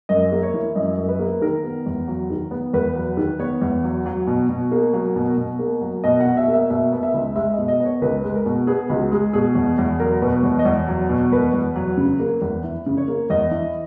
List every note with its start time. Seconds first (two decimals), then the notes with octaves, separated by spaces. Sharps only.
0.09 F#2 D#5
0.32 A#3
0.43 C#5
0.54 E3
0.75 F#2 D#5
0.97 F#2
1.09 B4
1.19 A#3
1.42 D#3 A#4
1.63 B3
1.86 E2
2.08 F#3
2.30 D#3
2.51 B3
2.73 E2 B4
2.96 F#3
3.17 D#3
3.39 B3 C#5
3.62 E2
3.84 F#3
4.06 F#3
4.27 B2
4.49 B2
4.72 A#3
4.93 F#3
5.16 B2
5.37 B2
5.59 A#3
5.81 F#3
6.04 B2 D#5
6.20 F#5
6.25 B2
6.37 E5
6.48 A#3
6.54 E5
6.70 B2 E5
6.92 B3
7.03 E5
7.14 C#2
7.36 G#3 E5
7.53 D#5
7.58 B2
7.68 D#5
7.80 B3
7.85 C#5
8.02 C#2 B4
8.24 G#3
8.35 A#4
8.46 B2
8.67 B3 G#4
8.90 C#2 F#4
9.12 G#3 G#4
9.33 B2 G#4
9.55 E2
9.78 E2
10.00 F#3 A#4
10.22 B2 B4
10.43 E2 C#5
10.59 D#5
10.65 E2 C#5
10.88 F#3
11.09 B2
11.32 E2 B4
11.53 E2
11.76 F#3
11.97 C#3
12.19 A#3
12.42 E2
12.64 E3
12.86 C#3
12.97 C#5
13.08 A#3
13.30 E2 D#5
13.51 E3